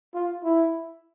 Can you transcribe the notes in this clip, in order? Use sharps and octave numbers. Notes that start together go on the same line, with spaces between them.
F4
E4